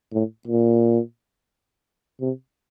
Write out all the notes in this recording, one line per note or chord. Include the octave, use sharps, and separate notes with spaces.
A2
A#2
C3